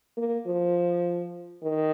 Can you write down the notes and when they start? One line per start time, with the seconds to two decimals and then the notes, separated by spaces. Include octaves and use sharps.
0.17 A#3
0.46 F3
1.63 D#3